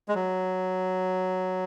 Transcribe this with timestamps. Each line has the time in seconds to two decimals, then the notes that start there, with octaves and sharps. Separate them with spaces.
0.08 G#3
0.15 F#3